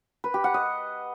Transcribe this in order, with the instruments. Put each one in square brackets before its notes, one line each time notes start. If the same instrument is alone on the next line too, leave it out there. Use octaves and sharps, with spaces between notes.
[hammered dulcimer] B4
G4
F#5
D#5